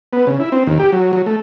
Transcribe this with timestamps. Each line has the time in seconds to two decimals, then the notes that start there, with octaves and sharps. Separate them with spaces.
0.13 B3
0.27 C#3
0.40 E4
0.52 C4
0.67 D#2
0.80 G4
0.92 F#3
1.13 F#3
1.26 A3